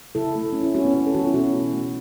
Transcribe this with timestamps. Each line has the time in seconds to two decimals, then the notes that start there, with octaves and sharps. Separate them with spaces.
0.15 C#3 E4 A4
0.35 A3
0.53 A3 C#4
0.63 E4
0.74 A3 C#4 F#4
0.85 B3
0.94 C#3 C#4
1.07 A4
1.14 E3 C#4 F#4
1.27 E4
1.34 B2 C#4 F#4
1.54 A3
1.74 A3